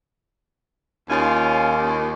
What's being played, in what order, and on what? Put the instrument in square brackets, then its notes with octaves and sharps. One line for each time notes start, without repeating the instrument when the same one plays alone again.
[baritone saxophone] D#2 [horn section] C#4 F4